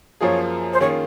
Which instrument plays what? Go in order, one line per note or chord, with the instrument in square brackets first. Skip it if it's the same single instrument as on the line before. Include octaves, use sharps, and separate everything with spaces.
[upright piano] F#2 F3 A#3 F4 G#4 [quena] C#5
[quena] C5
[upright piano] D#3 A#3 C#4 F4 G#4 [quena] C#5